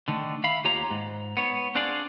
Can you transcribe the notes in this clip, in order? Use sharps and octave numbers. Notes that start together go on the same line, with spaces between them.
D3 D#3 A3
E5 F5 B5
D#2 F4 G4 C#5 A#5
G#2
B3 C#5
C4 D4 F4 G#4 D5